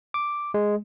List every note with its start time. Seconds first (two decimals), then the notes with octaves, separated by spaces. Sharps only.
0.14 D6
0.54 G#3